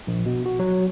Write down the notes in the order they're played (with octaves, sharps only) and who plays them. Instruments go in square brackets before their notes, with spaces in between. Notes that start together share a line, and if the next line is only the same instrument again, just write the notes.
[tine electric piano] A#1
B2
F#4
F#3